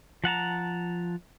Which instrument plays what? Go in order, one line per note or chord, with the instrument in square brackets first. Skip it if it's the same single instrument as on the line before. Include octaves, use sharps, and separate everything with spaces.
[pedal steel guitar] F3 F#5 A5 A#5